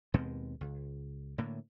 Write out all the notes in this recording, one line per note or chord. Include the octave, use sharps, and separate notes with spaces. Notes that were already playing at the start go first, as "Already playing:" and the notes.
D#2 B2 G#3 C4
C#2
A2 D3 A#3